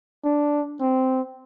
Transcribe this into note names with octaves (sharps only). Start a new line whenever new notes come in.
D4
C4